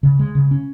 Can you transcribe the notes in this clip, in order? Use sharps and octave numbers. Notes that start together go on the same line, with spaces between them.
C#3
G#3
C#3
C#4